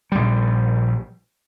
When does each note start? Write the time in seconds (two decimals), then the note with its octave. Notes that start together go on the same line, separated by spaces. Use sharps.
0.12 A#1 G3